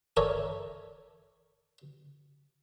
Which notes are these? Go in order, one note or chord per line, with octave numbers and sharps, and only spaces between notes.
A4 A#4 C#5 D5 E5 G#5